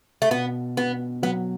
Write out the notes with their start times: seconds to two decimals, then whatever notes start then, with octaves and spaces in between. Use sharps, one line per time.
0.22 A3
0.31 B2 B3
0.77 B2 B3
1.22 F#3 B3